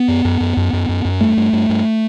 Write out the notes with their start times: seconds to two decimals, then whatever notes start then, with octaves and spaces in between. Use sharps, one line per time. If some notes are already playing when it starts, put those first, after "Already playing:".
Already playing: B3
0.08 F#2
0.25 F#2
0.40 F#2
0.57 F#2
0.73 F#2
0.89 F#2
1.05 F#2
1.21 G2 A3
1.37 G2
1.53 G2
1.69 G2